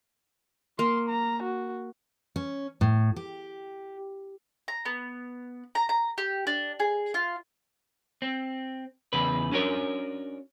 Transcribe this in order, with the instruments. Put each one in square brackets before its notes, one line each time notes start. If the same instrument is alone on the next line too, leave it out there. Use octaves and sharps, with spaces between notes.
[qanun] A#3 [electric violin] C6
[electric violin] A#5
F#4
[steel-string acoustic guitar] C#4
A2
G4
[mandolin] A#5
B3
A#5
A#5
G4
D4
G#4
F4
[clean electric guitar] C4
E2 C#3 B4
C#4 D4 F#4 A#4 C#5